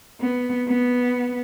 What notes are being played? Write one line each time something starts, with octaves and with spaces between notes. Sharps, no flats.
B3
B3